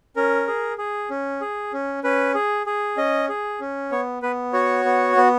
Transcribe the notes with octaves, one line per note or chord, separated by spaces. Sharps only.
C#4 A#4
G#4
G#4
C#4
G#4
C#4
C#4 B4
G#4
G#4
C#4 D#5
G#4
C#4
B3 C#5
B3 B4
F#4 C#5
B3
B3